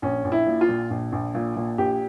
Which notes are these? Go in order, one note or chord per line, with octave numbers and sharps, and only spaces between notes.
A#1 C#4
A#1
E4
A#2
F4
A#2
A#1
A#1
A#2
A#2
A#1 G4